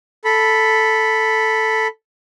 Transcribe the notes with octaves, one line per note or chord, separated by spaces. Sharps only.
A4 B5